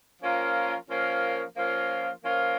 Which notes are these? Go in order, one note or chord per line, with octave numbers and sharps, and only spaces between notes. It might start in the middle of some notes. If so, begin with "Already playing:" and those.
F3 A#3 C#4 F4 A#4
F3 A#3 C#4 F4 A#4
F3 A#3 C#4 F4 A#4
F3 A#3 C#4 F4 A#4